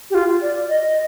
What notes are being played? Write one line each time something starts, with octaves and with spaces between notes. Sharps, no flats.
G4
F4
D5
D#5
D#5